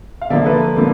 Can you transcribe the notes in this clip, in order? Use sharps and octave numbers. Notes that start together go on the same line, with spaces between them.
F5
D3 F3 A#3 D5 E5
A4 B4
D3 F3 A#3